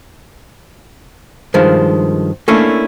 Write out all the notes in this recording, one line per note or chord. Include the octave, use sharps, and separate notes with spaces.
G2 D#3 F3 G#3
A3 A#3 C#4 D4 E4